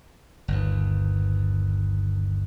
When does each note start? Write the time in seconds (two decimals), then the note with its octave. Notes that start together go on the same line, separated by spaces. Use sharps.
0.48 G1 D#2